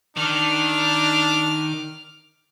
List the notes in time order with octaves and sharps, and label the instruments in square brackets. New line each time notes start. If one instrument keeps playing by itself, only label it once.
[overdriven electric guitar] D#3 [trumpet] D4 [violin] D6 F6